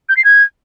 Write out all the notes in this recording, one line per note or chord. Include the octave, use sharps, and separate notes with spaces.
G6
C7
G#6